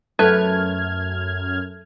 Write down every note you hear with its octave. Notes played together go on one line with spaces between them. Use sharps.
F#2 A3 B4 F6 G#6